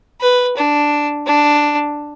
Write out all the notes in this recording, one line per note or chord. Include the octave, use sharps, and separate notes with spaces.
B4
D4
D4